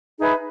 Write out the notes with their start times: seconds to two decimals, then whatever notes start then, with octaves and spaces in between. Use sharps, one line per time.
0.17 D#4 G#4 B4 E5